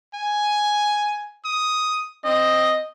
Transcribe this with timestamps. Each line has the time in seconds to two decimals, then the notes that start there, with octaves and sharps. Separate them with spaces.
0.14 G#5
1.45 D#6
2.25 C4 D#5